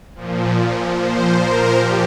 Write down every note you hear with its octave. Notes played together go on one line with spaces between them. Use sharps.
A#2 F3
A#2 F3 C5
A#4
A#2 F3 G4